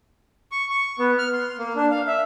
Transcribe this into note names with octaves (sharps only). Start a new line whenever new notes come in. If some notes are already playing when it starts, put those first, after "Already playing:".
C#6
C#6
B3
F6
C6
A#3
D4
F5
E5